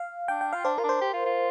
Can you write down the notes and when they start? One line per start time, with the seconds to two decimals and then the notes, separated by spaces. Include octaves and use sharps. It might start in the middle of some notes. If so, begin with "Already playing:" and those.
Already playing: F5
0.28 D4 G5
0.41 G5
0.53 F4 F5
0.64 D4 C5
0.78 F4 A#4
0.83 D4
0.89 C5
1.01 G4
1.13 F4
1.25 F4